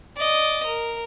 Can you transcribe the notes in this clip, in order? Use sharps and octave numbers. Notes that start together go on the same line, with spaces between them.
D5 D#5
A#4